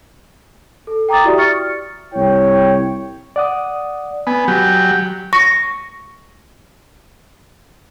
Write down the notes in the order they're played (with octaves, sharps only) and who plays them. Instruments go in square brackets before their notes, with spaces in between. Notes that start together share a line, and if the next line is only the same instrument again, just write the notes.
[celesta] A4
G5 A#5 D6 D#6 A6
E4 F#4 G4 D5 E5
C#6 F6 A6 C#7
[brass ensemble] C2 E4 C#5 G5
[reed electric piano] D5 F#5 D#6
[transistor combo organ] B3 [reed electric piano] G#5
[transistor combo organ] F#3 G4
[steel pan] C#6 [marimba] A#6